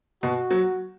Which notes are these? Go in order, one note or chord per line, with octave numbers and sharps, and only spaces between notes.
B2 F#4
F#3